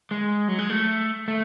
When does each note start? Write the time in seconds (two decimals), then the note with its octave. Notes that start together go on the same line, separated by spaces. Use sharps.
0.11 G#3
0.48 F#3
0.59 G#3
0.70 A3
1.28 A3